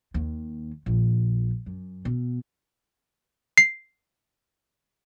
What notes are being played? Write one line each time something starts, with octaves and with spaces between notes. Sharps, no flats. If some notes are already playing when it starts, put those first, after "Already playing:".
D#2
A#1
F#2
B2
C7